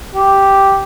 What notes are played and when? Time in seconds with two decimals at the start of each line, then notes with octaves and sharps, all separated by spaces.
0.15 G4